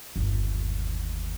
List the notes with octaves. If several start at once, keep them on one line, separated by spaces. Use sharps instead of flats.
G1 D#2